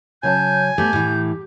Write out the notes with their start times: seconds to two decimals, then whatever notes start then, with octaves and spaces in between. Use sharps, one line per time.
0.23 C#3 F#3 G#5 A5 G6
0.78 A3 B3 G4 G6
0.93 A2 E3